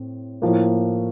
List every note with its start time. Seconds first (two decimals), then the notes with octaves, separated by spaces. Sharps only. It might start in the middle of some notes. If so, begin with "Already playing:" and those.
Already playing: A2 C4
0.42 A2 F3 A#3